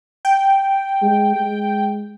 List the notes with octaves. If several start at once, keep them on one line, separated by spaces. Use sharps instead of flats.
G5
G#3
G#3